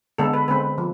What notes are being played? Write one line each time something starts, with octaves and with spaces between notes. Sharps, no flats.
D3 G#3 B3 A4
B4
D3 G#3 C4 B4
F3